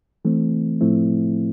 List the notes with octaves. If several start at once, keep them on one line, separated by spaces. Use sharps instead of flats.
E3 A3 C4
A2 F3 A3 C4 E4